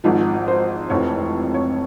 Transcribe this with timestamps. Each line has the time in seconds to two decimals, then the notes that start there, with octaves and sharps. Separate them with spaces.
0.04 G#1 G#2 F3
0.48 C5
0.90 F1 F2 E3 C#5
1.54 C#5